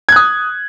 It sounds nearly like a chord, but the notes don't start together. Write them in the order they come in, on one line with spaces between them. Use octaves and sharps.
G#6 F#6 D#6